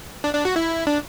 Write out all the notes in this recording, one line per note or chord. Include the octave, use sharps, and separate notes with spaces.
D4
D4
F#4
E4
D4